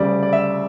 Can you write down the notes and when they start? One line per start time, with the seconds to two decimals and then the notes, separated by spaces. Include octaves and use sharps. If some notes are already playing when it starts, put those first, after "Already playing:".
Already playing: D2 C#3 G3 D5
0.23 D5
0.33 E5